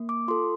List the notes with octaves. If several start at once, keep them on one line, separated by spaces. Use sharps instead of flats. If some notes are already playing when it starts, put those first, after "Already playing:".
Already playing: A#3
D6
F4 A4 C6